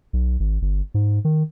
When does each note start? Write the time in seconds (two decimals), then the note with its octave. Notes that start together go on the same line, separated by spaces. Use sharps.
0.13 B1
0.40 G#1
0.62 G1
0.94 G#2
1.25 D#3